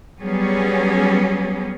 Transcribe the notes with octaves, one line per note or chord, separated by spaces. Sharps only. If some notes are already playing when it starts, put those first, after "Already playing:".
F#3 G3 B3 C#4 G#4